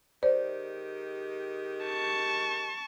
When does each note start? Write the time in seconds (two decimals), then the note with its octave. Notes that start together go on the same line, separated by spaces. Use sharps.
0.23 D#3 G#3 G4 C5 D5
1.85 A5 C#6